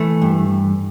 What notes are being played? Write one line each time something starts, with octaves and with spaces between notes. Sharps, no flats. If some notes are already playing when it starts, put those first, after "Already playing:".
Already playing: E3 A3
G2